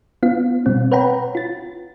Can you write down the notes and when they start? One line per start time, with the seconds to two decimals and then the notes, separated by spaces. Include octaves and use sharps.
0.23 B3 F4 F5
0.66 B2 G3 C4
0.92 B4 C#5 F#5 G5 A#5 B5
1.35 F4 A6